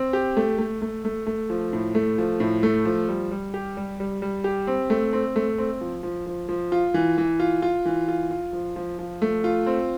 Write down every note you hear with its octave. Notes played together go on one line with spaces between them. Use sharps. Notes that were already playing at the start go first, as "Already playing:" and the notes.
Already playing: C4
G4
A3
A3
A3
A3
A3
F3
A2
A3
F3
A2
A3
F3
G3
G3
G4
G3
G3
G3
G4
C4
A3
C4
A3
C4
F3
F3
F3
F3
F4
E3
E3
F4
F4
E3
F4
F4
F3
F3
F3
A3
F4
C4